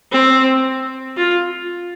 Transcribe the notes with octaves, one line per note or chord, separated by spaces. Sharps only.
C4
F4